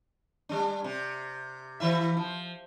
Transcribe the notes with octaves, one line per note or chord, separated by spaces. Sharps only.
G3 D4
C3
E3 E4 E5
F3